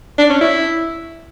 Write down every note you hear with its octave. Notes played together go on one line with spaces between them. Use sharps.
D4
C#4
E4